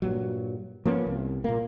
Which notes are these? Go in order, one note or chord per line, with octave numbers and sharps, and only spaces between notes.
G2 A#2 F#3
F3 A#3 B3 C#4
C2
A#2 A#3